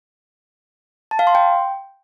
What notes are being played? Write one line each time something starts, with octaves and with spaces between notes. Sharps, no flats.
A5
F5
C6
G5